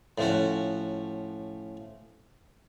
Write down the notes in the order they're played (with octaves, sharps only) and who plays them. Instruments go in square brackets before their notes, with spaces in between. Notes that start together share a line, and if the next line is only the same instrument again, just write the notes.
[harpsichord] A2 F3 C#4 F#4